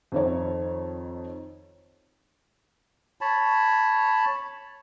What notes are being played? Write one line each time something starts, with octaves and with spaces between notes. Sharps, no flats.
F2 D#3 C#5
C#5 A5 B5